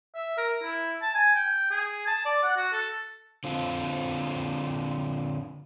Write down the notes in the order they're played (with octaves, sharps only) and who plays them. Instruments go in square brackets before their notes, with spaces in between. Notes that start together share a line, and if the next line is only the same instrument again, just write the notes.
[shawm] E5
A#4
E4
A5
G#5
G5
G#4
A5
D5
F#5
F#4
A4
[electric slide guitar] D3 C4 F4